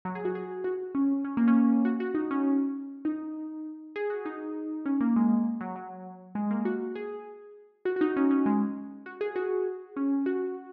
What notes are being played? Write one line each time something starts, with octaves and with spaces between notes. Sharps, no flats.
F#3
G#4
F#4
G#4
F#4
C#4
C#4
A#3
C#4
F#4
F#4
D#4
C#4
D#4
G#4
F#4
D#4
C#4
A#3
G#3
F#3
F#3
G#3
A#3
F#4
G#4
F#4
F#4
D#4
C#4
C#4
G#3
F#4
G#4
F#4
C#4
F#4